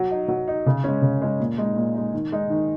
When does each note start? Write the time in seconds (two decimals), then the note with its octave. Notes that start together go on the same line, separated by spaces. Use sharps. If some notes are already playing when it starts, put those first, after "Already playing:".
Already playing: F#3
0.11 D#4
0.28 F#3
0.48 D#4
0.66 C#3
0.84 G#3 C#4
1.02 C#3
1.22 G#3 C#4
1.40 A#2
1.58 G#3 D#4
1.76 A#2
1.94 G#3 D#4
2.13 D#3
2.32 G#3 D#4
2.50 D#3